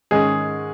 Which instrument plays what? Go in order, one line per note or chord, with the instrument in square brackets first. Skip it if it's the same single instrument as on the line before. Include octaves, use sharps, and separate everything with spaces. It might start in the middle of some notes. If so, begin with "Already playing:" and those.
[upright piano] G#2 D#3 G#3 C#4 [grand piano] G#4